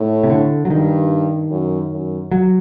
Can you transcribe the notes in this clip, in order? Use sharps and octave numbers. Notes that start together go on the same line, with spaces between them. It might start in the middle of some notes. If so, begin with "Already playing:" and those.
Already playing: A2
C3
D3
F#3
G2 D#3
F#2
F#2
F#3